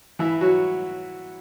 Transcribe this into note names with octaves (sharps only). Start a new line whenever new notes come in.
E3 E4
F#3 F#4